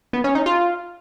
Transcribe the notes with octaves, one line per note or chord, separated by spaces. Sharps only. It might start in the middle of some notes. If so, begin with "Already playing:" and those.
B3
C#4
D#4
F4